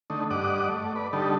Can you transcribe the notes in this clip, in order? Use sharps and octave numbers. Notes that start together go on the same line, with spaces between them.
D3 A3 D#4
G2 D5 D#5 F#5 D6
A3
B4 D5
D3 G3 D#4 A4